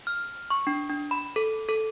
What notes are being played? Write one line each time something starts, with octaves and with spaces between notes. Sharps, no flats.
F6
C#6
D4
D4
B5
A4
A4